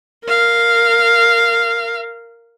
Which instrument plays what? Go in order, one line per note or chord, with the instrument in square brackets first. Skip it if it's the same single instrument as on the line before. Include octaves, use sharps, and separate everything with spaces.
[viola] A#4 F5